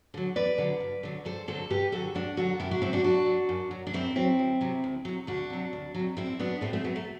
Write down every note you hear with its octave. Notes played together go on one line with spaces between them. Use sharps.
D3 F#3
E2 B4 D5
D3 F#3
G2
D3 F#3
G2 A4 C5
D3 F#3 A4 C5
G2 G4 B4
D3 F#3 F#4 A4
G2 D4 F#4
D3 F#3 F#4 A4
F#2 E4 G4
D4 F#4
F#3 C4 E4
D4 F#4
F#2 D4 F#4
F#3
F#2
F#3
D4
F#2 C4 E4
F#3 C4 E4
D2
C3 F#3
D2
C3 F#3
D2 D4 F#4
C3 F#3
D2
C3 F#3
A2 C4 E4
F#3 B3 D4
A2 A3 C4
A3 C4
F#3 B3
A3